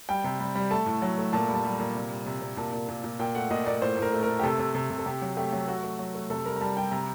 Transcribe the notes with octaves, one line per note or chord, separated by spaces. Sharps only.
G3 G5
C3
G3
G3
A3 A5
A2
F#3
A3
A#2 A5
G3
A5
G3
A#2 A#5
C3
G3
C3
C3
A#2 A5
A#2
A#2
A#2
A#2 G5
A3 F#5
A#2 D#5
A#2 D5
A2 C5
A2
A#4
A3
A#4
A3
G4
C3 A4
C3
C3
C3
A4
C3 G4
F#3
A3 G4
F#3
A3 F#4
A3
F#3
A3
C3 A4
G3 A#4
A#5
G3 A5
G3 G5
C3 A#5